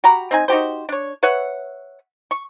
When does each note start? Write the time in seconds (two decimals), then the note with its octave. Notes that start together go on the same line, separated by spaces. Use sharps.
0.04 F#4 G4 A#5 B5
0.31 C4 D#4 G#5
0.48 D#4 F#4 G4 C5
0.89 D4 C#5
1.23 B4 C#5 E5 F#5
2.31 C#6